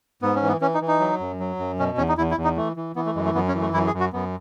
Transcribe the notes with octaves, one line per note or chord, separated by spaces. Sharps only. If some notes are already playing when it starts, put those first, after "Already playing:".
G#2 B3
C#4
E3
B3
E3 C#4
D#4
E3
D#4
F#3
F#2
F#3
F#2
B2 C#4
E2 C#4
D#4
E2 E4
E4
E2
D#4
E3 A3
E3
E3 B3
A3
F#2 G#3
A3
F#2 B3
C#4
E3
A3
F#2 E4
G#4
F#2
F#4
F#2 B3